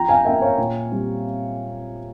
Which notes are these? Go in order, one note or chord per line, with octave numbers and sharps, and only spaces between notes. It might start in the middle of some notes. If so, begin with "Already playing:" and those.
Already playing: F3 G5 A#5
F5 G#5
A#3 C#4 E5 G5
C#5 F5
A#2
G3 C4